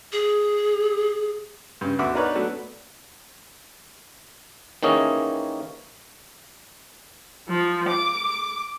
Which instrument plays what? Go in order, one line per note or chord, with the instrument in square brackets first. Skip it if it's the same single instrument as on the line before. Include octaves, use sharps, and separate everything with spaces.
[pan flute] G#4
[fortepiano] G2 C#3
D2 B3 F#4 E5 D6
D4 D#4 A#4 B4 C#5 D5
F#3 A3 B3 D4
[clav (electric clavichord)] D#3 E3 A#3 C#4 G#4 D#5
[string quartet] F3
D6